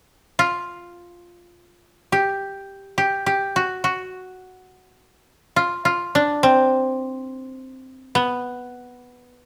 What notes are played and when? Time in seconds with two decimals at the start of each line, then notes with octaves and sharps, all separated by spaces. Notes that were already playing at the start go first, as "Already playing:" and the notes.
0.39 F4
2.12 G4
2.98 G4
3.26 G4
3.56 F#4
3.84 F#4
5.56 F4
5.85 F4
6.15 D4
6.43 C4
8.15 B3